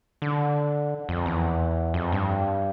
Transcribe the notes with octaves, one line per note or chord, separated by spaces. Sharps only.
D3
F2
E2
F2
G2